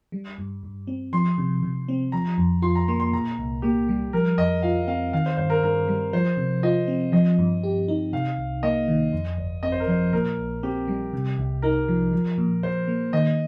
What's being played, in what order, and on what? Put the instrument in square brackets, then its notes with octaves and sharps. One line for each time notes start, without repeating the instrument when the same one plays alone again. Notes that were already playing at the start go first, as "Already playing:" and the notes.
[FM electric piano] G3
G2
G2
C4
[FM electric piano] F3 [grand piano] C6
[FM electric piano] C3
C3
C4
[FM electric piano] F3 [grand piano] A#5
[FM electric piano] F2
[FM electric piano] F4 [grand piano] C6
[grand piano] A#5
[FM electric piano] A#3 [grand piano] C6
[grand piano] C6
[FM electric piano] A#2 [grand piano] A#5
[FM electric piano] C2
[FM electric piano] A#3 [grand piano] G4
[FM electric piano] G3
[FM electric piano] F3 [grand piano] A#4
[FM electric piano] F2 [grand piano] D#5
[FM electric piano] F4 [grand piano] F5
[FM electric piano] C4 [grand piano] F5
[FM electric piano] D#3 [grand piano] F5
[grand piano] C5
[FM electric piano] G2 [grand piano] C5
[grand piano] A#4
[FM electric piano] G2 [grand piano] A#4
[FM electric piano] G3
[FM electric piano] F3 [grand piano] C5
[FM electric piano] C3
[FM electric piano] F4 [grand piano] D#5
[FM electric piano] C4
[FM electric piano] F3 [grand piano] D#5
[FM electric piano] G2
G4
D#4
[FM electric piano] C3 [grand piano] F5
[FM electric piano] C2
[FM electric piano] A#3 [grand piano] D#5
[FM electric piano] D#3
F2
G1
[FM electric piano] C4 [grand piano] D#5
[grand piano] C5
A#4
[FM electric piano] F3 [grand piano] C5
[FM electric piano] A#2 [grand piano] A#4
[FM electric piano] A#1
[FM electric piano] C4 [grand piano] G4
[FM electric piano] G3
C3
C2
[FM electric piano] D#4 [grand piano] A#4
[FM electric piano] F3
F3
A#2
[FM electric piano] A#2 [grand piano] C5
[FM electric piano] A#3
[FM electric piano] D#3 [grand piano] D#5